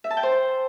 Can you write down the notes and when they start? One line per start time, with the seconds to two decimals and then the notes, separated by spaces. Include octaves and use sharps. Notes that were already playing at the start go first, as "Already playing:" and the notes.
0.04 E5
0.10 A5
0.17 G5
0.23 C5